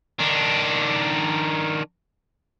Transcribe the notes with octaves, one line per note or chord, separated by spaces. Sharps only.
D#3 D4